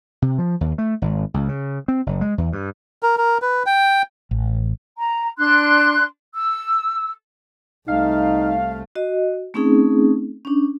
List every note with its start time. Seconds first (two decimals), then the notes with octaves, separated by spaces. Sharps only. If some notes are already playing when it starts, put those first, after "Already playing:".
0.22 C3
0.38 F3
0.61 D#2
0.78 A3
1.02 G#1
1.34 C#2
1.49 C#3
1.88 C4
2.06 F#1
2.21 G#3
2.38 E2
2.53 G2
3.03 A#4
3.18 A#4
3.42 B4
3.66 G5
4.31 A1
4.98 A#5
5.38 D4 C6 F#6
6.34 E6
7.88 C2 A3 D#4 F5
8.95 F#4 D#5
9.54 A3 C4 C#4 D#4 G#4
10.45 C#4 D4